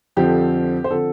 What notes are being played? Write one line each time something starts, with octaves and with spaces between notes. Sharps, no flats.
F2 D3 F3 C4 G4
C5
D3 F3 C4 A4